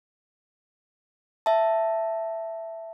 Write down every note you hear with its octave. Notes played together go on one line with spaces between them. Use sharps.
E5 A5